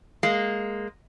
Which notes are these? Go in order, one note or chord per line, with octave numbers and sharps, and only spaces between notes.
G#3 A#3